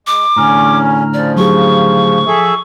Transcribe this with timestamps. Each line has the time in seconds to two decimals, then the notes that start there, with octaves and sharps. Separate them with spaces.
0.07 G#3 D6
0.36 E2 A2 D3 C#4 A#5 F6
1.14 C#3 F3 D5
1.36 F#3 G4 G#4 C#6
2.27 F3 G#4 A4 E5